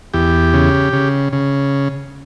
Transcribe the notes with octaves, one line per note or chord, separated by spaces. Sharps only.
E2 G4
C#3
C#3
C#3